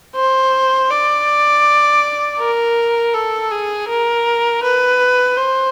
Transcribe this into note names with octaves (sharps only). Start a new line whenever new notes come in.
C5
D5
A#4
A4
G#4
A#4
B4
C5